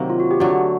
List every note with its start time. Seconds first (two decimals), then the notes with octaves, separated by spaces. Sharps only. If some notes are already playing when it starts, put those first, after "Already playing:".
Already playing: C3 D#3 F#3 A#3
0.10 F4
0.20 F#4
0.31 G4
0.40 D3 F#3 A3 F#4